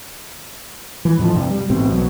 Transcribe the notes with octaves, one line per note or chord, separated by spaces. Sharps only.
E3
F2 A2 F3
G2 C3
G3
A1 G#2 B2 C4
B1 B2 F#3